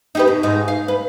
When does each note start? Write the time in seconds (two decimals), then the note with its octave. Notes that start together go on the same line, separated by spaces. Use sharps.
0.15 D#4 G4 B4
0.27 B2
0.43 G#2 D#4
0.68 F5
0.88 B4